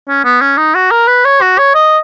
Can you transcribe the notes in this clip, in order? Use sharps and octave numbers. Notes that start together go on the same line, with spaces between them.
C#4
B3
C#4
D#4
F#4
A#4
B4
C#5
F#4
C#5
D#5